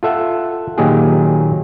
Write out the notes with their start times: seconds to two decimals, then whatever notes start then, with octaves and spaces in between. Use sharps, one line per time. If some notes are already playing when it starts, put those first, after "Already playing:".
0.03 F4 A4 E5 F#5
0.78 A#2 D#3 F#3 A#3 G4 G#4